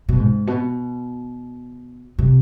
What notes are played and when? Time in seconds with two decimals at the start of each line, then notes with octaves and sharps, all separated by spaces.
0.09 B2
0.19 G#2
0.47 B2
2.19 C3